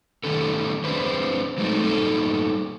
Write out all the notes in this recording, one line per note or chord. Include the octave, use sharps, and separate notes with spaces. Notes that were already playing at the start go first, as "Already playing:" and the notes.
A2 D#3 G3 A3 C#4 A4
D4 G#4 B4 C5
F#3 G#3 A3 C4 D#4
G3 A#3 D#4 A4